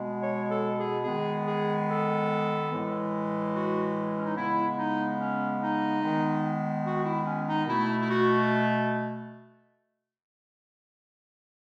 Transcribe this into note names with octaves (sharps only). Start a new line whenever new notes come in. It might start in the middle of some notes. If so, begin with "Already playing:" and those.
Already playing: B2 G#3 B3
C#5
A4
G#4
D#3 G#3 B3 G#4
G#4
A4
A2 E3 G#3
F#4
C#4
D#4
C#3 G#3 B3 E4
D#4
C#4
D#4
D#3 G#3 B3
F#4
E4
C#4
D#4
B2 A3 E4
E4
F#4